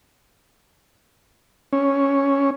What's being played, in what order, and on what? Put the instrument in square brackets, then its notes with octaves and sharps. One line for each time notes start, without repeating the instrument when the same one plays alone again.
[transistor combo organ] C#4